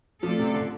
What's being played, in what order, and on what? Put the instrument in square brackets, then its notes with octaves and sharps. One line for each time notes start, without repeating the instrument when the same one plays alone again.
[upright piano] F3 [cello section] A3 C4 F4 A4 D5
[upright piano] C3
D3